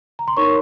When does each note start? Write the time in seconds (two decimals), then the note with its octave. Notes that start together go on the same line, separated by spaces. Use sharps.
0.19 A#5
0.28 C6
0.37 D#4 A#4 C#5 C#6